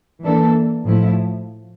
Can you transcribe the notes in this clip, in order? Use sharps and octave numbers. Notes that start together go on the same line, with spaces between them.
E3 A#3 D4 A4
A2 F3 A3 E4